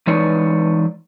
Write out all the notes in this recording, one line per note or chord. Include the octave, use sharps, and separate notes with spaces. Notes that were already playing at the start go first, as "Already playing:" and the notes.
E3 G#3 D#4 B4 C#5 D5